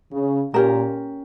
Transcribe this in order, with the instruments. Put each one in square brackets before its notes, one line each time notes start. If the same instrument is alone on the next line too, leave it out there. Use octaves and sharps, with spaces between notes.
[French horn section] C#3
[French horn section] A#2 [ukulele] C#4 G4 A#4